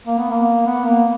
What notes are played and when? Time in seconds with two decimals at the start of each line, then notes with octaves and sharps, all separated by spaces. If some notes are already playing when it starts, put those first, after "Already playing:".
0.07 A#3
0.18 B3
0.29 A#3
0.66 B3
0.86 A#3